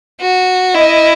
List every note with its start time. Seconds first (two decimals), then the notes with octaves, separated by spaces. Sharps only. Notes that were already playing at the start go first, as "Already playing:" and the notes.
0.21 F#4
0.74 E4 D#5